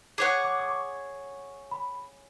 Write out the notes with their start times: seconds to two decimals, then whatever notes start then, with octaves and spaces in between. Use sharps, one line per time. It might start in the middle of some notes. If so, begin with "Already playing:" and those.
0.18 G#4 C#5 F#5 D6
0.44 D6
0.60 D6
0.69 C#6
1.71 B5